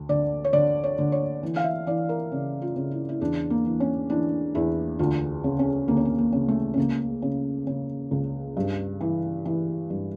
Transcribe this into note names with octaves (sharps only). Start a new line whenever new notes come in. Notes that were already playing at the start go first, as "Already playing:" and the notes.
Already playing: D2
D3 D5
C#5
D3 D5
C#5
D3
C#5
E3
F5
E5
E3 D5
A#4
C#3
F4
C#3
E4
E4
E2 D4
A#3
E3
C#4
E3 D4
E2 E4
D2 F4
C#3
C#4
D2 A#3
C#4
A#3
A#3
C#3
A3
C#4
C#2 A#3
C#3
C#3
C#2
G2
E3
E3
G2